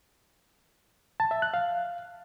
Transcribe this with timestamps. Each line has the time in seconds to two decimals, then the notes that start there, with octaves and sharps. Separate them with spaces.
1.20 A5
1.31 E5
1.42 F#6
1.54 F5